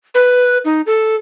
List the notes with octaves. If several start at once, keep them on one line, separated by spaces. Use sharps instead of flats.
B4
D#4
A4